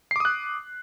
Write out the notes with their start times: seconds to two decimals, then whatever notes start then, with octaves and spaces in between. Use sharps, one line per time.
0.11 C7
0.16 D6
0.20 D#6
0.25 F#6